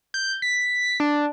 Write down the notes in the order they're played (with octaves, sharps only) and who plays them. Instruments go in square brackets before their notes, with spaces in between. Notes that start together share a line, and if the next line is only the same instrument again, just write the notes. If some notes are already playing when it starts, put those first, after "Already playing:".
[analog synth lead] G6
B6
D4